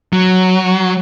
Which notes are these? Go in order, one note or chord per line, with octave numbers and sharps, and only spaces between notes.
F#3